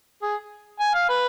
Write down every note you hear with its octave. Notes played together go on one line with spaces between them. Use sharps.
G#4
G#5
F5
B4